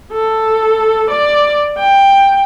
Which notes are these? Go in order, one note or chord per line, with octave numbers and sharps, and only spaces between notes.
A4
D5
G5